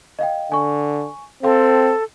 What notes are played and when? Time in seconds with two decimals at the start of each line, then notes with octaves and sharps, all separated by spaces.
0.19 D#5 F5 G5
0.52 D3 G#5 C#6
1.43 C4 A4 F5 G5 C6